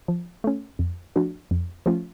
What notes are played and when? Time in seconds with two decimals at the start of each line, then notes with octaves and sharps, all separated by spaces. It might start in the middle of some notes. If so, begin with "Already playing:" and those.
0.08 F3
0.44 A3 C#4
0.79 F2
1.16 F3 A3 D4 F#4
1.51 F2
1.86 F3 A3 C#4 F4